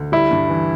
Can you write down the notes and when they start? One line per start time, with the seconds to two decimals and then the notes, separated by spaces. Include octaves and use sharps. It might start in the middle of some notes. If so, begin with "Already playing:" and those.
Already playing: D2
0.12 G3 E4
0.31 G2
0.50 E3